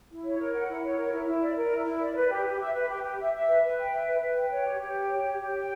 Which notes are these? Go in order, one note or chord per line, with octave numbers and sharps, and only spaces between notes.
E4
C#5
A#4
F#5
E4
C#5
A#4
E4
E4
D5
A#4
E4
E4
D5
B4
G4
G4
E5
B4
G4
G4
E5
E5
B4
B4
G5
E5
B4
B4
G5
C#5
G4
G4
G5
C#5
G4
G4
G5